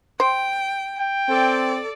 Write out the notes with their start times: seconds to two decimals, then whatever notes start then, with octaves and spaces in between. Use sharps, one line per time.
0.20 C5 G5
0.98 G5
1.29 C4 A4 D5